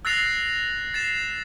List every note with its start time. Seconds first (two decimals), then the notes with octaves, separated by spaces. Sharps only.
0.05 E6 F#6 A6 A#6 C7 F7
0.94 A6 C7 E7